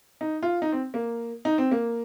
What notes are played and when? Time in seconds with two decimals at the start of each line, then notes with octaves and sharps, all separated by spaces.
0.21 D#4
0.43 F4
0.62 D#4
0.72 C4
0.94 A#3
1.45 D#4
1.58 C4
1.71 A#3